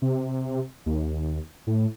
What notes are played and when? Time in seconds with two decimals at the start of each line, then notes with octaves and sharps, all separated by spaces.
0.02 C3
0.86 D#2
1.67 A2